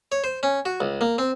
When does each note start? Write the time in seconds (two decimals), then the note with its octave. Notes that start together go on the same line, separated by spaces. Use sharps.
0.12 C#5
0.24 C5
0.43 C#4
0.65 F#4
0.81 C#2
1.01 A#3
1.18 C4